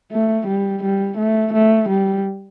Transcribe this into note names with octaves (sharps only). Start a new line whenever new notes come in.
A3
G3
G3
A3
A3
G3